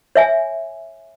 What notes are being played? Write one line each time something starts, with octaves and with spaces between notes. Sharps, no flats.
C#5 E5 G#5